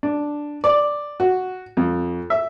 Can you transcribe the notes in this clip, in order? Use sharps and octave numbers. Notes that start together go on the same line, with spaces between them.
D4
D5
F#4
F2
E5